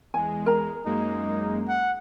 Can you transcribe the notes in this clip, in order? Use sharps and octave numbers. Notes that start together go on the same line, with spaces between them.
E2 G#3 G#5
A#4 A#5
F#2 G#3 A#3 D#4
F#5